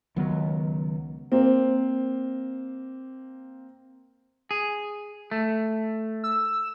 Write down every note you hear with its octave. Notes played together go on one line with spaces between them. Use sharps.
C#2 D#3 F#3 B3
A#3 C4
G#4
A3
E6